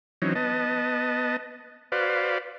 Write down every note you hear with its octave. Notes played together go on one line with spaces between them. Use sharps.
E3 F#3 C4 C#4 D#4
B3 D#5 A5
F#4 B4 C5 D5 F5